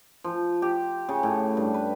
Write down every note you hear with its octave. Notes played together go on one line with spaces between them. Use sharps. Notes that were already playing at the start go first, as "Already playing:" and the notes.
F3
G4
C#3
A2
G2
B4